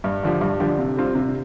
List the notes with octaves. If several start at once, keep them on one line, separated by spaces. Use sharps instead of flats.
G2
D3 F3 D4 G4
G2
D3 F3 D4 G4
C3
G3 C4 F4
C3